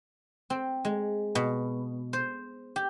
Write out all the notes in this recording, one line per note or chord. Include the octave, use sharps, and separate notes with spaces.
C4
G#3
B2
C5
G4